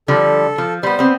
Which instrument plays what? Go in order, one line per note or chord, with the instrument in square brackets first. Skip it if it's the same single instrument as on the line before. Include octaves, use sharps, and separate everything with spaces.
[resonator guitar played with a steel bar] D3 F3 G3 [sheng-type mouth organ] A4
[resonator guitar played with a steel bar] F3
[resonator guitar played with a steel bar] G3 B3 [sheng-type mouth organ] C5
[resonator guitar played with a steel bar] B3 C4